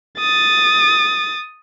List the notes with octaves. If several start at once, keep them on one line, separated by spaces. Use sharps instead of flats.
D#6 A6